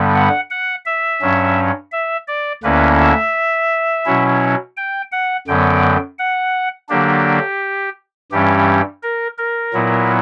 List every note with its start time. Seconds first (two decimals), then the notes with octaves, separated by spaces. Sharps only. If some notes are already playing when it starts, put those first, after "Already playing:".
Already playing: G2 D3 G3 B3
0.15 F#5
0.50 F#5
0.86 E5
1.21 G2 F#3 C#4
1.92 E5
2.28 D5
2.63 D2 D3 A#3 C#4 E4 B4
2.99 E5
4.05 B2 F#3 C#4 E4
4.77 G5
5.12 F#5
5.47 F#2 D3 F#3 B3 G5
6.19 F#5
6.89 D3 F#3 A#3 D4 G4
8.32 G2 E3 G3 C#4 G4
9.03 A#4
9.38 A#4
9.73 A#2 F#3 B3 E4